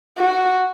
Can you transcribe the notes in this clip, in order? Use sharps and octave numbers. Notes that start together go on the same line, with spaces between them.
F#4